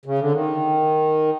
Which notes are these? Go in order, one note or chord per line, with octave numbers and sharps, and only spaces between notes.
C#3
D3
D#3